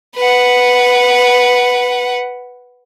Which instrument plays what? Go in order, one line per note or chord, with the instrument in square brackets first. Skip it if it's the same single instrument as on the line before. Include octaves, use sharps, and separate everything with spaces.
[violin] B4 F#5